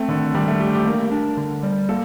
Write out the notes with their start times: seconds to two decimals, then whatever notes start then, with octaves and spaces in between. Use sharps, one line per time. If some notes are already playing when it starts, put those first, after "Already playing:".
Already playing: A3 C4
0.08 D3 D#3
0.34 D#3 G3
0.47 A3
0.60 A3 G4
0.74 G4
0.86 A#3 A#4
1.11 D4
1.37 D3
1.63 G3
1.89 A#3 A4